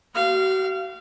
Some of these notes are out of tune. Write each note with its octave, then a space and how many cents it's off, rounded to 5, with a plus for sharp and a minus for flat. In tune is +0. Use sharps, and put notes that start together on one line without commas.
F#4 +45 F5 -25